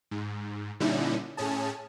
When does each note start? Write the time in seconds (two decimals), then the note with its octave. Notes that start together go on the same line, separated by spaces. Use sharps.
0.11 G#2
0.80 A#2 D3 G3 C#4 D#4 E4
1.37 A2 C#4 G#4 A5